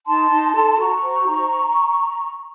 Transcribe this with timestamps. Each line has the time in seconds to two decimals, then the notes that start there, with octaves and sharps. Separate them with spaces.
0.07 D#4 A5 C6
0.31 D#4
0.55 A4
0.79 F#4 A#5 C#6
1.03 C5
1.28 D#4